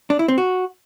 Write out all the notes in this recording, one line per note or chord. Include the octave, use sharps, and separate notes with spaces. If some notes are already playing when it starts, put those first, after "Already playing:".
D4
E4
C4
F#4